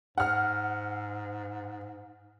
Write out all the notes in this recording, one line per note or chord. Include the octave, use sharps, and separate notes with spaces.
G#2 F#5 F6